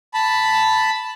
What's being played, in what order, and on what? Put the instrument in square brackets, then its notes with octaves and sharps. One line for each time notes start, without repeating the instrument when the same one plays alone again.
[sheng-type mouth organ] A5 B5